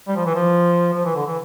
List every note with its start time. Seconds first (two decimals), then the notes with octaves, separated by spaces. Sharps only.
0.08 G3
0.16 F3
0.26 E3
0.34 F3
0.94 F3
1.05 E3
1.15 D3
1.26 E3